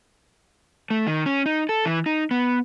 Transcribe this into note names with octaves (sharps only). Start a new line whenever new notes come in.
A3
D#3
C#4
D#4
A4
E3
D#4
B3